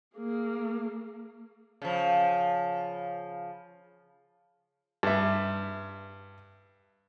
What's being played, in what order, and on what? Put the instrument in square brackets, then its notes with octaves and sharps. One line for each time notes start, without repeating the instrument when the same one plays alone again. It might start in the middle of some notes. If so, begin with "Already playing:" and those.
[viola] A#3 G#4
[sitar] C#3 F3
[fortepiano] G2 E5